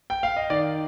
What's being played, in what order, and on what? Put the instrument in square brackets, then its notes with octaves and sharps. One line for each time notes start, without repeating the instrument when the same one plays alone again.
[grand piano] G5
F5
D#5
D#3 D5